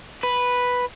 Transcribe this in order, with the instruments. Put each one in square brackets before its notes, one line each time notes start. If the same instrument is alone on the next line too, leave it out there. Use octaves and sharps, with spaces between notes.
[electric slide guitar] B4